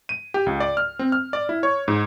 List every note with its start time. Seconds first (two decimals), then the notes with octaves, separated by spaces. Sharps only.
0.09 D#7
0.34 G4
0.46 C#2
0.60 D5
0.77 F6
0.99 C4
1.12 F6
1.33 D5
1.49 E4
1.63 C#5
1.88 G#2